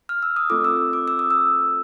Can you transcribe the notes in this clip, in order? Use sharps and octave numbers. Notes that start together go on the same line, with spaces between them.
F6
E6
D#6
A3 C4 F4 A4 D6
E6
D6
E6
D#6
E6